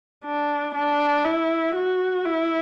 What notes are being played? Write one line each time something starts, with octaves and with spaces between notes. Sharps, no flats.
D4
D4
E4
F#4
E4